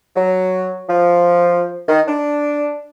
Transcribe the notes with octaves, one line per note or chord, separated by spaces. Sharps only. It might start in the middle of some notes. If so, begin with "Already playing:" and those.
F#3
F3
D#3
D4